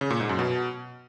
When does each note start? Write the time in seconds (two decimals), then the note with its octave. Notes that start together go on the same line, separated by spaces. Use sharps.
0.01 C#3
0.10 A#2
0.20 G#2
0.29 F#2
0.39 B2